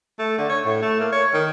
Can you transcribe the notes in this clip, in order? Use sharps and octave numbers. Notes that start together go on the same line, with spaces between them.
A3
D3
C#5
A2
A3
A#3
C#5
D#3